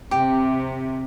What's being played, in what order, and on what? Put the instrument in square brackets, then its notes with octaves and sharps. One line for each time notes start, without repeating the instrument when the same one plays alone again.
[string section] C3 [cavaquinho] G4